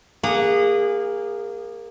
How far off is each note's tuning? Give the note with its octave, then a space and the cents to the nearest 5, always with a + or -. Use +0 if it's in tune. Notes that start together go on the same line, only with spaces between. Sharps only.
A#3 +0 G#4 -30 F#5 +0